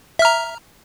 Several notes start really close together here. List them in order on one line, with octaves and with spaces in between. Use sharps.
E5 F6 A#5